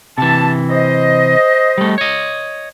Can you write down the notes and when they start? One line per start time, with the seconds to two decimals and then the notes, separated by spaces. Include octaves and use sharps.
0.18 C3 E3 A5
0.70 C5 D#5
1.78 G3 A3
1.98 C#5 D#5